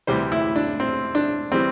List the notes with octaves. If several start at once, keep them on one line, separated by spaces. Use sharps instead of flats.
D2 C3 E3 G3 C5
E4
D4
C4
D4
E3 G3 C4